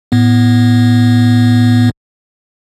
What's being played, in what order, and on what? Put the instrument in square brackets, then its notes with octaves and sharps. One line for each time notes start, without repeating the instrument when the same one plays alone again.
[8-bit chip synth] A2 B3